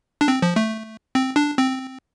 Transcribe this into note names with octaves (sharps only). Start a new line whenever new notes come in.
D4
C4
F3
A3
C4
D4
C4